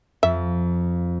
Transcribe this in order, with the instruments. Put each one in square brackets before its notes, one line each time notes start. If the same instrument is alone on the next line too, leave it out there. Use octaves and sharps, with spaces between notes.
[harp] F2 [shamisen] E5